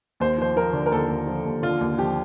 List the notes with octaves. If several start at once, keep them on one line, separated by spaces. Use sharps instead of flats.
D#2 C5
F3 C5
F3 A#4
D3
A#4
D#2 A4
D#2
F3
D#2
D3 F4
D#2
F3 G4